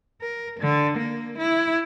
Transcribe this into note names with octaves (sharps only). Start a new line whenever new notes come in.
A#4
D3
A#3
E4